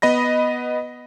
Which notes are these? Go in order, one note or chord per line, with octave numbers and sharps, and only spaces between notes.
B3 D#5 B5 A#6